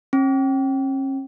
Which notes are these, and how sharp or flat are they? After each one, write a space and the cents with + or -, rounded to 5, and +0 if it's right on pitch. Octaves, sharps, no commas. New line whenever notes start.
C#4 -40